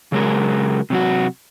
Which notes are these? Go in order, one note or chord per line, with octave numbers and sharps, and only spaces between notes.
C#3 F#3 G#3 F#4 G#4 A#4
C3 F#3 F#4